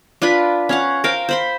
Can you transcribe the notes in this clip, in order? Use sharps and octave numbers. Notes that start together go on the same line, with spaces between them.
D4 F4 B4 B5
C#4 F5 F#5
A#4 C5 F5 G5
C5 B5 C6